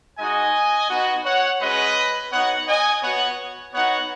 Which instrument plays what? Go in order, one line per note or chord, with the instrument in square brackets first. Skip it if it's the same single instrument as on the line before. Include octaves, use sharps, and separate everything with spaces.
[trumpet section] G#3 D#4 F#4 D#5 G#5
B3 D#4 F#4
C#5 F#5
G#3 C#4 F#4 B4 D#5
B3 D#4 F#4 C#5 F#5
D#5 G#5
B3 F#4 C#5 F#5
B3 D#4 F#4 C#5 F#5